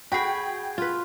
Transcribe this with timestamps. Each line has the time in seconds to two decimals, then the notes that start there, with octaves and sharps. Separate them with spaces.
0.12 F#4 G#4 G5 B5
0.78 F4 B4